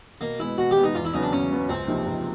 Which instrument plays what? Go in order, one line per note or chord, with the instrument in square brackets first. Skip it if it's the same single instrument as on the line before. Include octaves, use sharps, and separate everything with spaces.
[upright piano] B2 [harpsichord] A#3
[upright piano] G#3 B3 [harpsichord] E4
[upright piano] B2 [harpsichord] F#4
[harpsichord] G4
[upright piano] G#3 B3
[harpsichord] D#4
[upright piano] E2 [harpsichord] F4
[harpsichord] E4
[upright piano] C#3 F#3 B3 [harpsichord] D#4
[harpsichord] D4
[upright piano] E2 [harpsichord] C#4
[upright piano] C#3 F#3 B3
[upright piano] C#2 [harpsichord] C4
[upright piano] C3 F3 A#3 D#4
C#2